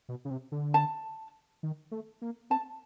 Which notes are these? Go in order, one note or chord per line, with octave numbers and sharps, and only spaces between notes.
B2
C#3
C3
D3
A5
D#3
A3
A#3
C4 A5